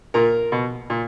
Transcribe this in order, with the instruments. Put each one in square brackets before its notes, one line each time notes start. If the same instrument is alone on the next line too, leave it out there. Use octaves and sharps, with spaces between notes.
[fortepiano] A#2 A#4
B2
A#2